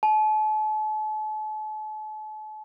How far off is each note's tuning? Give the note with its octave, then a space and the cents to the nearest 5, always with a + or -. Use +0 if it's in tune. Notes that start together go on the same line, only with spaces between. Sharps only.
A5 -40